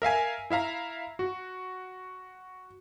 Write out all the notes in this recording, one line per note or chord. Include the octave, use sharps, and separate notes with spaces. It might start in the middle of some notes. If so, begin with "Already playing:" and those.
A#4 E5 F5 G#5
E4 E5 F5 A#5
F#4